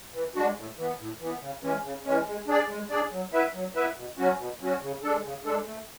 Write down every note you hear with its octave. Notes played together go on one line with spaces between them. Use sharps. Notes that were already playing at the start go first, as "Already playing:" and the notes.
E3
G#3 D4 F#4
A2
E3 B3
A2
E3 B3
C#3
E3 G#3 C#4
C#3
E3 G#3 C#4
G#3
D4 G#4 D5
G#3
D4 G#4 D5
F#3
B3 E4 B4 E5
F#3
B3 E4 B4 E5
B2
F#3 C#4 F#4
B2
F#3 C#4 F#4
C#3
G#3 D4 A4
C#3
G#3 D4 A4
A3